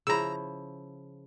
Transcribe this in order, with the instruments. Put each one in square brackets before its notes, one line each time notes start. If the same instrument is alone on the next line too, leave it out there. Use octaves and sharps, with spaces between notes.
[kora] C#3 F3 E4 [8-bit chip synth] A#5 E6